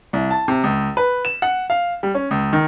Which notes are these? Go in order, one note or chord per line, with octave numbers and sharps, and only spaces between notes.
C2
A5
C3
C#2
B4
E7
F#5
F5
G3
C#4
C#2
D#3